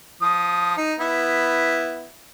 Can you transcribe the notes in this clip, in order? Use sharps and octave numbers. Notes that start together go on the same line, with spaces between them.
F3 D#6
D#4
B3 E4